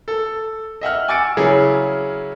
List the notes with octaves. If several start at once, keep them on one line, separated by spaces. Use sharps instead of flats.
A4
D#5 E5 F#5 F6
G#5 D6 E6 A6 C#7 D7
C#3 F#3 E4 G#4